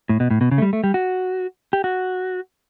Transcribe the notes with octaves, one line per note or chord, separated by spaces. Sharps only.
A2
B2
A2
B2
C#3
A3
G3
A3
G3
F#4
G4
F#4